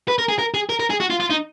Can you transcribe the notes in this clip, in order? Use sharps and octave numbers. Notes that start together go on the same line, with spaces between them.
B4
A#4
G#4
A#4
G#4
A#4
A#4
G#4
F#4
F4
F4
D#4